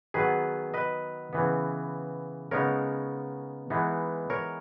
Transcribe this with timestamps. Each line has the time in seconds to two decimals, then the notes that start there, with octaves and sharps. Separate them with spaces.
0.14 D#3 F#3 B3 G#4 B4
0.74 B4 D#5
1.33 C#3 E3 B3
2.51 C#3 G#3 B3 D#4 A#4 C#5
3.70 E3 G#3 B3 D#4
4.30 A#4 C#5